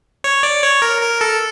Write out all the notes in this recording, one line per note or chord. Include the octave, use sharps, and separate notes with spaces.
C#5
D5
C#5
A#4
A#4
A4